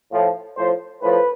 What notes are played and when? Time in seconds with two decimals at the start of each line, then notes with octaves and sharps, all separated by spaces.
0.11 A2 F3
0.57 A2 F3 C5
1.02 A2 F3 B4